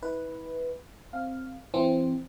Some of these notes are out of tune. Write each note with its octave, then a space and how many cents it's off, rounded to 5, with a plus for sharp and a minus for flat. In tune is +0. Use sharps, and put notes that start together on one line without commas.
E4 -35 B4 +0
C4 +0 F5 +0
E3 +25 C4 +0